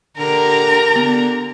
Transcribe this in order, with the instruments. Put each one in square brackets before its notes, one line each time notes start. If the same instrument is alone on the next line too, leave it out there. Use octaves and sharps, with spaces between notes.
[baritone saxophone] D3 [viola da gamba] G4 A#4 [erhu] A#5
[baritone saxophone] D3 [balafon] B3